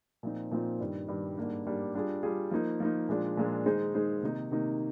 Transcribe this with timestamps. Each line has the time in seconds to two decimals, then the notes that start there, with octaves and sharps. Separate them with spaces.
0.23 A#2 F3 C4 D#4
0.51 A#2 F3 C4 D#4
0.80 G2 D#3 G3
1.08 G2 D#3 G3
1.38 G#2 G3 A#3 D4
1.66 G#2 G3 A#3 D4
1.95 G3 D4 F4 G#4
2.23 G3 D4 F4 G#4
2.51 F3 A#3 D#4
2.80 F3 A#3 D#4
3.09 A#2 F3 G#3 D4
3.37 A#2 F3 G#3 D4
3.66 D#3 G#3 D#4 G#4 C5
3.95 D#3 G#3 D#4 G#4 C5
4.23 C3 D#3 A#3 D#4
4.51 C3 D#3 A#3 D#4